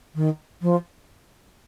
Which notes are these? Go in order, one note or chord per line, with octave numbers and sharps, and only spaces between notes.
D#3
F3